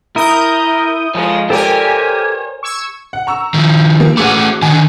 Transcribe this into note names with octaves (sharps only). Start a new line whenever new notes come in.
E4 A#4 D#6 G6
F3 G#3 F5 G#5
G4 A4 A#4 C5 C#5 G5 G#5 D6
C#6 E6 G#6
F#5
A#5 C#6 E6
D#3 F3
G3 A#3
A3 C#4 F#4 G#4 D6
D3 D#3 G#5